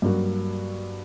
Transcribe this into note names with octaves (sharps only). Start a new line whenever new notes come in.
G2 F#3 A#3 F#4